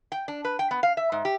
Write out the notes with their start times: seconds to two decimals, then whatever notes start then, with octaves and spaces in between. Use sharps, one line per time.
0.12 G5
0.28 D4
0.45 B4
0.59 G5
0.71 B3
0.83 F5
0.97 E5
1.12 G#2
1.25 G4